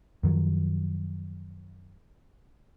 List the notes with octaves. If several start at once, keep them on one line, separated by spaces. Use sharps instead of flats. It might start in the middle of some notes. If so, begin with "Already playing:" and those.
F#2 D#3 F3 F#3